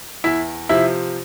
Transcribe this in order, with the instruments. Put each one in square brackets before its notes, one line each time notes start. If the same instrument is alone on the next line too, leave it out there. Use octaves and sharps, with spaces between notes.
[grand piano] E2 E4 E5
C3 F3 E4 E5